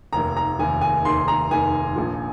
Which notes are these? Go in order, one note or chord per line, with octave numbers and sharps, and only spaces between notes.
F1 D#2 D#3 A#5
A#5
F1 D#2 D#3 G#5
G#5
F1 D#2 D#3 C6
A#5
F1 D#2 D#3 G#5
A#1 A#2 F3